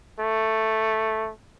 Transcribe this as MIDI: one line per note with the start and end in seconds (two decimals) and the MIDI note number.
0.20 1.31 57